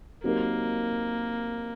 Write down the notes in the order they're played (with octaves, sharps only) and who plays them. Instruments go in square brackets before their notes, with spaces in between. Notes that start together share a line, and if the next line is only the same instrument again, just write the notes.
[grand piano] F#3 C4 D#4 G4 A#4 [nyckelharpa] A#3